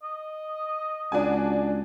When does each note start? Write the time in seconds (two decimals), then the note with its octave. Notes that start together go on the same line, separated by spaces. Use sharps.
0.03 D#5
1.12 C#2 D4 F#4 G#5